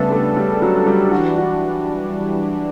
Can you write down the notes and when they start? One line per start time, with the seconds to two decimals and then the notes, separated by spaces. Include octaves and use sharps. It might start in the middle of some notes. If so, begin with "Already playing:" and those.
Already playing: C#3 G3 A3 B3 D4 A4
0.12 A3
0.37 G3
0.62 F#3
0.87 G3
1.12 E3 G3 D4 F#4
1.38 F#4